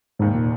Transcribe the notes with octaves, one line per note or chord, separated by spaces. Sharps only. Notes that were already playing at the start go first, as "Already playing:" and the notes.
F1 D#2 G#2 D#3
A#2